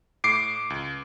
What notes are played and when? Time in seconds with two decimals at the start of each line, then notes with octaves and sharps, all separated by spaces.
0.24 A2 D6 C7 D7
0.70 C#2